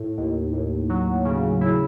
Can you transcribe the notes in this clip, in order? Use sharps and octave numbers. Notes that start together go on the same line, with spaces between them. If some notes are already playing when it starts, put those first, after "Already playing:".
Already playing: A2
D#2
D#2
F#3
C#3
E4